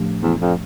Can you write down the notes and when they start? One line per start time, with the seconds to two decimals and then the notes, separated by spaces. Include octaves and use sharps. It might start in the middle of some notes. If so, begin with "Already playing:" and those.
Already playing: A2 F3 A3 D4 G4
0.21 E2
0.40 F2